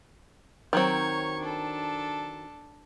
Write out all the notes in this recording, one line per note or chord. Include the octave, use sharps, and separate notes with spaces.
D#3 F#3 C4 C#5 C#6 G#6
D4 A4